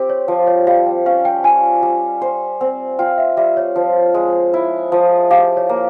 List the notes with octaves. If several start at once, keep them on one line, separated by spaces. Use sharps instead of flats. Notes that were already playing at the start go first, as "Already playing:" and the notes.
Already playing: C4 G4
C#5
F3
C#5
G3 F5
G5
C#4 F5
G5
F4 G#5
G3
C5
C4
F4 G5
E5
G3 E5
C#5
F3
G#3
E4
F3
G4 F5
C#5
A#3